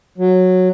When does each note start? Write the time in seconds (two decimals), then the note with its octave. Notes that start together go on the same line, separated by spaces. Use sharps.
0.18 F#3